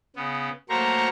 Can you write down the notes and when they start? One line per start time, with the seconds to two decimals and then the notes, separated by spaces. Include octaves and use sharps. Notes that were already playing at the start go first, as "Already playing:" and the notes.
0.16 C#3 B3
0.69 F#3 A3 A#3 C5 A#5 C#6